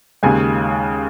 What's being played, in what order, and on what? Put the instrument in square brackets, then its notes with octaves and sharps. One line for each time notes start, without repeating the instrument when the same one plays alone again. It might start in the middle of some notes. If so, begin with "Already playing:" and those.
[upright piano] D#2 C#3 G#3 G#5